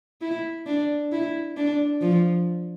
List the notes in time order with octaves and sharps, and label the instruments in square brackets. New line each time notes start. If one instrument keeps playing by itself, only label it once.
[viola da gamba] E4
D4
E4
D4
F3